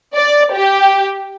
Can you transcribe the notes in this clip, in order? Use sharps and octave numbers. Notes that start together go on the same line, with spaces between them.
D5
G4